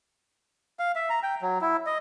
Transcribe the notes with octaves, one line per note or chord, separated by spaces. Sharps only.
F5
E5
A#5
G5
F#3
E4
D#5